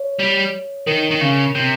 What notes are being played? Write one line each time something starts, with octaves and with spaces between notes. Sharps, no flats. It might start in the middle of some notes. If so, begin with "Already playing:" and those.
Already playing: C#5
G3
D#3 A#4
D#3
C#3
C3